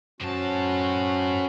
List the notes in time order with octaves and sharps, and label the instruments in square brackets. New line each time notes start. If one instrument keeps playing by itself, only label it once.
[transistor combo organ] F#2 C5 [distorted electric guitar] A2 A5 [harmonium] C#4 F#4